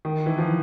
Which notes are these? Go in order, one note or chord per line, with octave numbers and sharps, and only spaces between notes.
D#3
E3
F3